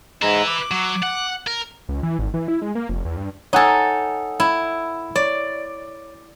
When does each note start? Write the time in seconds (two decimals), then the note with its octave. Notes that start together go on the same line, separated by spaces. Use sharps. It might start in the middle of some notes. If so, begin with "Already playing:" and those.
0.22 G#2 G#3 E4 B4 A#5
0.47 D6
0.71 F#3
1.03 F#5
1.47 A#4
1.89 C#2
2.03 E3
2.19 G#1
2.34 E3
2.48 E4
2.62 G#3
2.75 A#3
2.89 F1
3.05 E2
3.17 G2
3.53 D#4 A4 C#5 F#5 G#5
4.40 E4
5.16 C#5 D5